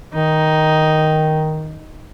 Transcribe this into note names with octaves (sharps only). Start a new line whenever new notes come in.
D#3 D#4